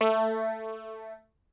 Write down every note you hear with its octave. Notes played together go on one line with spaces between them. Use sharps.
A3